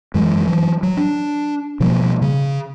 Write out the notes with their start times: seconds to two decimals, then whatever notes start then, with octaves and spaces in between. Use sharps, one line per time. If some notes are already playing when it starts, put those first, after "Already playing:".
0.14 F#2 E3 F#3 G#3
0.47 E3 F#3
0.83 F#3
0.97 D4
1.80 B2 F3 G3 A#3
2.22 C#3